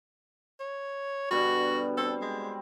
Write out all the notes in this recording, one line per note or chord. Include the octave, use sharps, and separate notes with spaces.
C#5
B2 D3 G3 F#4
C4 A4
G#3